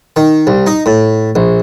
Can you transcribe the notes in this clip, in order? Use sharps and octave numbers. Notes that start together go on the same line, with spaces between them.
D#3
C2
D#4
A2
A#1